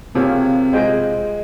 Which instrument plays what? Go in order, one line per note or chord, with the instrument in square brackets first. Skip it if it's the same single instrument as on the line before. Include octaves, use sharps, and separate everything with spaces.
[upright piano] C3 [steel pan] A#3 F4 G#4 C#5 F5
[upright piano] G#3 [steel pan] F4 G#4 C5 D#5 G5